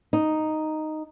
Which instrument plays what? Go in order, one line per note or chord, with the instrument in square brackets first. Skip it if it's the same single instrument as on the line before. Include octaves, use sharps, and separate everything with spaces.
[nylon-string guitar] D#4